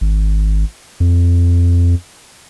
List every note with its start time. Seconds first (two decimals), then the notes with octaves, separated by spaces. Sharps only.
0.01 G#1
1.00 F2